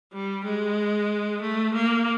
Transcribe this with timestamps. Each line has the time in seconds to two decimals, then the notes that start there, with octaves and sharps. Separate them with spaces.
0.13 G3
0.44 G#3
1.41 A3
1.74 A#3